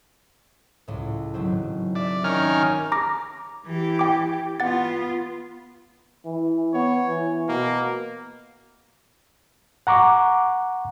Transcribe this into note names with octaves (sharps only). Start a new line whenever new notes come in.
C#2 A2
G#1 F#3 C4
D5 E5
D#3 C#4 F6
A#5 D6 A#6
E3 G4
G5 D6
B3 F4 F#5 A6
E3
B3 C#5
E3
B2 A#3
F#5 A#5 C#6 D6